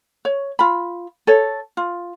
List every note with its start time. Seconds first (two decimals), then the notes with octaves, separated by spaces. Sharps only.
0.25 C#5
0.59 F4 B5
1.27 A4 C#5
1.77 F4